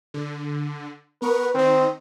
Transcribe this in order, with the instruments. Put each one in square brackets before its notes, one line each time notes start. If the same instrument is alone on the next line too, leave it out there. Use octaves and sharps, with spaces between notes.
[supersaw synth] D3
[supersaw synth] B3 A#4 C#6 [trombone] B4
[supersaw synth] D#3 D#4 [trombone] C4